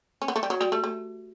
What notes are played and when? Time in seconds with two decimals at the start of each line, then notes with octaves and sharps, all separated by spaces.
0.22 C#4
0.28 B3
0.36 A3
0.43 G3
0.50 F#3 F#4
0.61 G3 F#4
0.72 A3 G4
0.84 A3